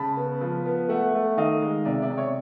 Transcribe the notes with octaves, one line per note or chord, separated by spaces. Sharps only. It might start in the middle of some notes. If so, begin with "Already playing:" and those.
Already playing: C#3 A5 B5
B3
F3
B3
A3 E5 F#5
A3
D#3 D#5 F5
G#3
C3 D5 E5
D5 E5
C3
C#5